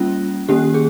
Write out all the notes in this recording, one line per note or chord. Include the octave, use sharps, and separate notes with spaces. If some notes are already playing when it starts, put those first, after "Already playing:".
Already playing: G3 A#3 C#4 F4
D#3 A#3 C#4 G4
G#4